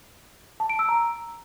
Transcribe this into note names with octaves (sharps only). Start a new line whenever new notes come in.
A5
D7
E6
A#5